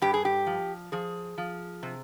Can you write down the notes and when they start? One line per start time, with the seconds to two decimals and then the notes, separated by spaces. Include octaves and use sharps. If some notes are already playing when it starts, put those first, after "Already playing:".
0.02 G2 G4
0.14 G#4
0.25 G4
0.46 F3
0.92 F3 G#4
1.38 F3
1.83 C3